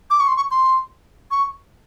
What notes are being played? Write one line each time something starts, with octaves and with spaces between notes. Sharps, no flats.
D6
C#6
C6
C#6
C6
C#6